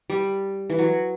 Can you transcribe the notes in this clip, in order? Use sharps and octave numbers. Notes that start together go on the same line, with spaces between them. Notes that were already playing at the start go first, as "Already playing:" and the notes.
G3
E3
F#3